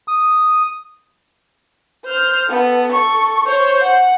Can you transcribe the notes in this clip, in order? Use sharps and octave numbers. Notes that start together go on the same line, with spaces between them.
D#6
C5 F6
B3 A4
A4 C#6
C5 C#5
F#5